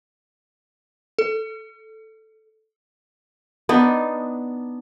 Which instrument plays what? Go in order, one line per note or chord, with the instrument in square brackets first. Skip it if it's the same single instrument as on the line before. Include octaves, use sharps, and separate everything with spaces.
[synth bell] A4
[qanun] B3 D4 D#4